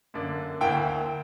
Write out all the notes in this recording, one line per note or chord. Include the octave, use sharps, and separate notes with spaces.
F#2 D3 A#3 D4
D2 D3 A#3 E4 G5